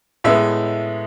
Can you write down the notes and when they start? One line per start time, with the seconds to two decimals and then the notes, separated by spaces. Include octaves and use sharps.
0.24 A2 G#3 B3 E5